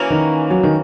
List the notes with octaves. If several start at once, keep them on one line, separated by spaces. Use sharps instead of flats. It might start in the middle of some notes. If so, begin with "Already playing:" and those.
Already playing: E3 A#3 C#4 F#4
D#3
F#3
D#3